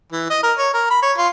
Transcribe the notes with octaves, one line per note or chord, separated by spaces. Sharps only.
E3
D#5
A#4
C#5
A#4
B5
C#5
F4